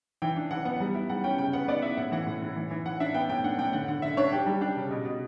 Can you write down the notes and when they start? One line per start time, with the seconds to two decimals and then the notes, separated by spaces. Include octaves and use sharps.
0.22 E3 G5
0.37 D4
0.51 E3 F#5
0.65 B3 F#5
0.80 G3
0.94 E4
1.09 G3 F#5
1.24 C#4 G5
1.38 C#3 G5
1.53 B3 F#5
1.68 B3 D5
1.82 E4 E5
1.97 A2 F#5
2.12 E3 F#5
2.27 A2
2.42 A2
2.56 E3
2.71 E3
2.86 E3 F#5
3.00 D4 E5
3.14 B3 G5
3.29 A2 G5
3.44 D4 F#5
3.58 A2 G5
3.73 D3 F#5
3.88 D3 F#5
4.02 D3 E5
4.17 D4 C#5
4.32 D4 G4
4.46 G3
4.61 D4 G4
4.77 C#3
4.90 B2
5.05 B2